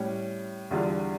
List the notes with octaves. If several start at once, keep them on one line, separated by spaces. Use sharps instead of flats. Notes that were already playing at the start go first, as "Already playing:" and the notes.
Already playing: A2 G3 C#4
E2 D3 G3 D4 F4